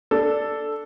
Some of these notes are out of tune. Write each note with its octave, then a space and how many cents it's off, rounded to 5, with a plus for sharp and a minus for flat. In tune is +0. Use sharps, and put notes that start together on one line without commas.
D4 +0 A4 +0